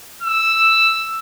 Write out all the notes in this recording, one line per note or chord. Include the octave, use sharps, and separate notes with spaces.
E6